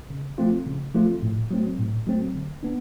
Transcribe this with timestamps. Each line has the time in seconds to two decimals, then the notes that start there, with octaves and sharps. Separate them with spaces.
0.10 C#3
0.38 F3 A3 C4 F4
0.66 C#3
0.94 F3 A3 C4 F4
1.22 A2
1.51 F#3 A3 C4
1.78 A2
2.07 F#3 A3 C4
2.35 D3
2.63 B3 D4